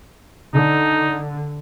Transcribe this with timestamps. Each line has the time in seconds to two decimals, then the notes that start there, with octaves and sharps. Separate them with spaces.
0.54 D3 D#4